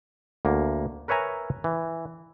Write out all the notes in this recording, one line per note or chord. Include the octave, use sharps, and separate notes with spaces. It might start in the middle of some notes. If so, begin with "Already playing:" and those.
D2 A#3
A#4 B4 C#5 E5 G#5 A#5
E3